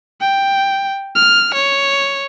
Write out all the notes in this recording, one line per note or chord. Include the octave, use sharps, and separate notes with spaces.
G5
F6
C#5